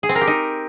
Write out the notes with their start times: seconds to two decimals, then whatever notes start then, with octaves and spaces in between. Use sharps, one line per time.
0.03 G#4
0.09 C4
0.15 A#4
0.21 G4
0.27 D#4